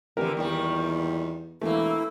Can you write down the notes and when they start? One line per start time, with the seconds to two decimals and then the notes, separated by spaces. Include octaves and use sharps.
0.17 F1 D3 E3 G4 A#4
0.37 E2 A#2 D#3 G3
1.61 E1 E3 A3 A#3 E4